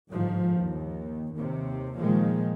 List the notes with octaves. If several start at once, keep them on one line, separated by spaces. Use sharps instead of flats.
G1 G#2 F3
D#2
D#2 C3
A#2 D#3 F3 G#3